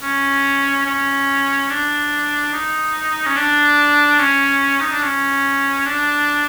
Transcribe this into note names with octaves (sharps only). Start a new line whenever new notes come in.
C#4
C#4
D4
D#4
C#4
D4
C#4
D#4
D4
C#4
D4